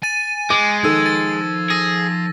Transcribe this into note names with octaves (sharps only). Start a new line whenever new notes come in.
G#5 A6 D#7
G#3 D6
D#3 F3 A4 E6 G#6
A6
G#4 A#6